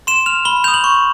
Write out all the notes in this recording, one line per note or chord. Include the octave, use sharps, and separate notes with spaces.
C6 E7
F6 F7
B5 G7
D#6 G6 F7
F#7
C#6